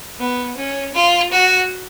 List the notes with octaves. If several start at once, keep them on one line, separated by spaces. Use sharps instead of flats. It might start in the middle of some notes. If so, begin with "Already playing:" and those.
B3
C#4
F4
F#4